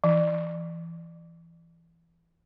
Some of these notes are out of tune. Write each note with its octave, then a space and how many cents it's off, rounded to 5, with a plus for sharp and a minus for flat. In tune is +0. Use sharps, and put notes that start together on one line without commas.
E3 +20